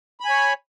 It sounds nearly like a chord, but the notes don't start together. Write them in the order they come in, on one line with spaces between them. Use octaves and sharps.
B5 G#5 C#5